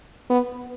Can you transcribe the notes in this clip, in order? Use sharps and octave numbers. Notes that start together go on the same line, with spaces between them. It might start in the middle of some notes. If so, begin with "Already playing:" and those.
B3